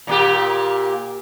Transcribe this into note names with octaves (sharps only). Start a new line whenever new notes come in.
A#2 A#3 G4